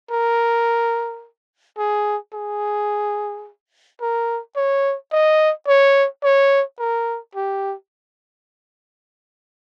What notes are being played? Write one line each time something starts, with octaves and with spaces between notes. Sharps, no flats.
A#4
G#4
G#4
A#4
C#5
D#5
C#5
C#5
A#4
G4